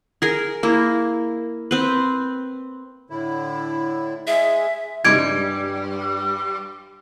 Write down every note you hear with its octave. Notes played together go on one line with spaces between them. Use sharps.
G#4 A#4
A#3 E4
C4 B4
A2 D3 E4
G#3 G#4 E5
G2 C#3 G3 G#3 D#4 G#6 D7